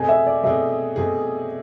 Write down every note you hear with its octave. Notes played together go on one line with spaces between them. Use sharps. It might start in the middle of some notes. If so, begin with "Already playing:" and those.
Already playing: B2 A3 C4 G#4 G#5
E5
D5
B2 A3 C4 G#4 E5
B2 A3 C4 G#4